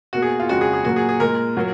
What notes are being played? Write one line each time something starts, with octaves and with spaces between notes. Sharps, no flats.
B2 A#3 F#4
G#4
F4
F2 C#3 G#3 F#4
G#4
G#4
A#2 F#3 A#3 F#4
G#4
G#4
A#2 G#3 A#4
A#2 F#3 A#3